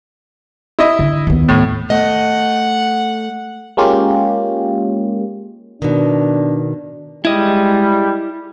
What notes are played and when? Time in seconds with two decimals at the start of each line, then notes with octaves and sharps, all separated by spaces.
0.79 E4 D#5
0.99 D3
1.27 D#2 B3
1.49 A2
1.90 A3 D#5 F#5
3.77 G#3 A#3 C#4 F4 G4
5.82 B2 D#3 D4
7.25 G3 G#3 E4 D#5